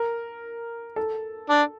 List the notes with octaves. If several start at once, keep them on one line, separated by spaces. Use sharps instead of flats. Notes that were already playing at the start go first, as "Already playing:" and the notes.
Already playing: A#4
A4
D4